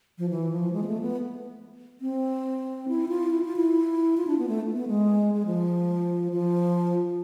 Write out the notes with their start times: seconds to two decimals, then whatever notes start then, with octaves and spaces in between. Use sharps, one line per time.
0.18 F3
0.30 E3
0.52 F3
0.73 G#3
0.83 B3
0.88 A3
1.01 B3
2.01 C4
2.88 E4
3.09 F4
3.30 E4
3.44 F4
3.56 E4
4.17 F4
4.27 D4
4.38 B3
4.48 A3
4.74 B3
4.88 G#3
5.34 G#3
5.46 F3
6.32 F3